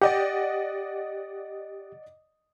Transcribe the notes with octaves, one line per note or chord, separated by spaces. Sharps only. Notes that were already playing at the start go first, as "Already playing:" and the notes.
G4 D5 D#5 F#5